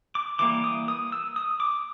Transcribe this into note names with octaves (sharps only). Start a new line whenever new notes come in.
D6
E3 G3 A#3 D6
D#6
D#6
E6
D#6
D6